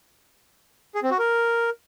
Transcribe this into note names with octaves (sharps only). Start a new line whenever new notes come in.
G#4
C4
F#4
A#4